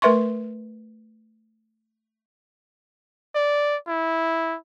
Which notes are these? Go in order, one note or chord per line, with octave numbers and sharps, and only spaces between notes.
A3 A#4 B4 E5 C6 C#6
D5
E4